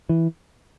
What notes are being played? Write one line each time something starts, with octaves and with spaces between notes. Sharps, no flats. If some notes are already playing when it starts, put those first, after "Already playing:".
E3